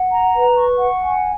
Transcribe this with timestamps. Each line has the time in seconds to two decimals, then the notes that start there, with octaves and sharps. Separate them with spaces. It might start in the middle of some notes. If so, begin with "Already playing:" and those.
Already playing: F#5
0.11 A#5
0.34 B4
0.56 C#6
0.78 F#5
1.01 G#5